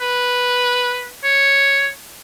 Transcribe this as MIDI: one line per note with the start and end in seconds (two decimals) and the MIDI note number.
0.01 1.09 71
1.24 1.88 73